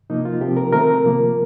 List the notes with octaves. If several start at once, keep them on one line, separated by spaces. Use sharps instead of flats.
C3 F3 A#3 D#4
F4
C3 F3 C4 G4
A#4
D#3 A3 C4 A#4
C3 F3 A#3